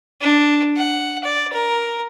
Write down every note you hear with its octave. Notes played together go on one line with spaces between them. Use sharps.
D4
F#5
D5
A#4